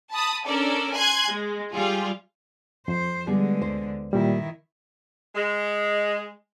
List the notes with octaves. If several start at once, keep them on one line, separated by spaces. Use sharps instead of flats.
A5 B5 D#6
C#4 D4 A4 A#4 D5
G#5 C6 F#6 G#6
G#3
G3 F4 G#4
F2 C5
D3 G3 G#3 B3 G#4
D2 C5
A#2 D#3 G3 E4
G#3